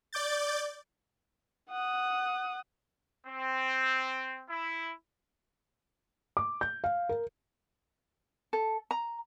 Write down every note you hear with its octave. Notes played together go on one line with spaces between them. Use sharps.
D5 D6 G6 A6
F#5 D#6
C4
E4
D6
G6
F5
A#4
A4
A#5